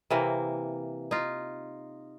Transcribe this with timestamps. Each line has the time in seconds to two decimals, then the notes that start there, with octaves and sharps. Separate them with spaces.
0.10 C3 E3 A#3
1.11 D#4 F4